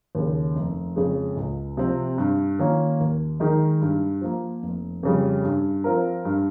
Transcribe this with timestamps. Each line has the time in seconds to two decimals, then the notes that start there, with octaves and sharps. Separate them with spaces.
0.15 D#2 C#3
0.55 F1
0.96 F2 C#3 G#3
1.37 C#2
1.77 C3 F3 C4
2.18 G2
2.59 D#3 A#3 C#4 F4
3.00 D#2
3.40 D#3 G#3 D#4 A#4
3.81 G2
4.21 F3 A#3
4.63 F1
5.03 F2 C#3 G3
5.44 G2
5.84 F3 C4 F4 A#4
6.25 G2